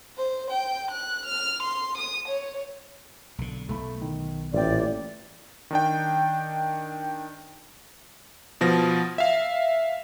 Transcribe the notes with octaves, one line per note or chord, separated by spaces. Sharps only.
C5
G5
F#6
F6
C6
D#6
C#5
B1 D3
B1 A3 B5
D#3
A1 A#2 D5 E5 G5
D#3 D4 G5
B2 F3 A#6
E5 F5